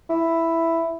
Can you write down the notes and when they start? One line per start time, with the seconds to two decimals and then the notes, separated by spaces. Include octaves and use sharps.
0.10 E4